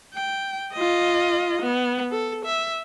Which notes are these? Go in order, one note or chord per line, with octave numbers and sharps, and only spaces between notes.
G5
F4 D#5
B3
A4
E5